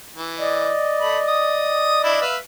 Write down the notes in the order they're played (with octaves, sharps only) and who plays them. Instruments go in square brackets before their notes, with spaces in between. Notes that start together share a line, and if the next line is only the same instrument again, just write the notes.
[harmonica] E3
[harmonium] D5 D#5
[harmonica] A3 B5
D#6
D4 E4
B4 E5 F5